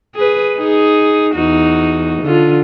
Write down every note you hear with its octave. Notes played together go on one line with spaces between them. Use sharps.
G#4 B4
D#4 G#4
E2 D#4 F#4
D3 F4